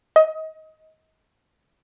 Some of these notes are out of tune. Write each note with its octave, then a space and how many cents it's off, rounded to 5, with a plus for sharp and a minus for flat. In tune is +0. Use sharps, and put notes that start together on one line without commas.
D#5 +25